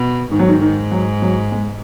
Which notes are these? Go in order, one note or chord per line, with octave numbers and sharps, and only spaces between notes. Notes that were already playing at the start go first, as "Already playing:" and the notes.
Already playing: B2
G#2 D#3
F#3
D#3
D#3
F#3
F#3
G#3